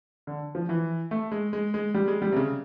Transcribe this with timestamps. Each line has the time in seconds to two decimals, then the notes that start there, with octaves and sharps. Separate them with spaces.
0.27 D3
0.55 F3
0.69 E3
1.11 A3
1.32 G#3
1.53 G#3
1.74 G#3
1.95 G3
2.08 G#3
2.22 G3
2.32 C3
2.36 C#3